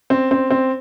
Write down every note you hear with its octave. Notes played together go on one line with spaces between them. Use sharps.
C4
C4
C4